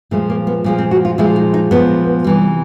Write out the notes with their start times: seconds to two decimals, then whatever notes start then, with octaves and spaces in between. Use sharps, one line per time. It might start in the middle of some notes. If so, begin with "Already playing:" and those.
0.11 A#2 F3 G#3 A3
0.30 A#3
0.47 B3
0.64 A#2 F3 G#3
0.78 C4
0.91 F#4
1.05 F4
1.18 A#2 F3 G#3 E4
1.36 D#4
1.54 D#4
1.71 A#2 F3 G#3 B3
2.24 C3 E3 G3